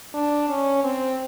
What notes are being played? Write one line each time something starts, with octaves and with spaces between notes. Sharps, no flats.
D4
C#4
C4